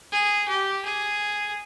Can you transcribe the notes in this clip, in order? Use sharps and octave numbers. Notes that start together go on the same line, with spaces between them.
G#4
G4
G#4